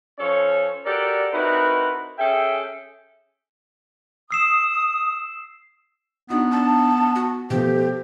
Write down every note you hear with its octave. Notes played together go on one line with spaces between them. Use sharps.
F3 C#4 A4 C#5
F#4 G4 A4 A#4 D5
C4 D#4 E4 F#4 A#4 B4
C#4 G#4 A4 E5 G5
D#6 E6 C7 E7
B3 D4 D#4 F#4
D4 A5
F#4
B2 F3 A3 G4 C5